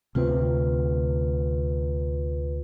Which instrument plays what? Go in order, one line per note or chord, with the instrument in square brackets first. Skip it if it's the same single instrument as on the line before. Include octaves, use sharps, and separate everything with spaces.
[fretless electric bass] D2 C3 C4 [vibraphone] F4 B4